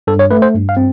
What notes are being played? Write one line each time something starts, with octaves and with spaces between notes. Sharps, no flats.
G2 A4
C#5
A3 B4
C5
G2
F5
C4